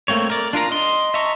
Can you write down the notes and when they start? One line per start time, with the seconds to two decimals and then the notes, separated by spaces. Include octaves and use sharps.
0.08 A3 A#3 C4 C#5
0.30 A#4 D5
0.53 D4 F4 A#4 A#5
0.71 D#5 C6
1.14 D#5 E5 A5 A#5 C#6